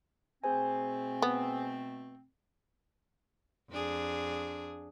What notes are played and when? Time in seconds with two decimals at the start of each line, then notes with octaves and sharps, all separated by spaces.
0.44 B2 A3 C4 G#4 C5 G#5
1.22 B3
3.70 F2 D4 G#4